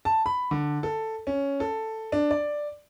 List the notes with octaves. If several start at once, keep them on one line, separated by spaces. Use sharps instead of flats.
A5
B5
D3
A4
C#4
A4
D4
D5